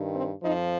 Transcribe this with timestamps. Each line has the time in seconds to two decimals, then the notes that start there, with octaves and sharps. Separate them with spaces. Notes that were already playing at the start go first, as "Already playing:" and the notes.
Already playing: G2 D#3
0.14 C4
0.43 F2 F3 D#4